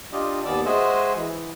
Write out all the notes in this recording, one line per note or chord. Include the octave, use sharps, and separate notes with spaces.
D4 F4 G4 D#5
D#2 B3 D5 E6
G#3 F#4 G#4 C5 D#5 E5
E3